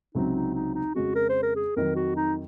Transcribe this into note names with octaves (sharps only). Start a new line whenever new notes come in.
C#2 C3 F#3 C4 D#4
D#4
D#4
D#4
F2 C#3 G#3 C#4 F#4
A#4
C5
A#4
G#4
F2 D#3 F#3 A#4
F#4
D#4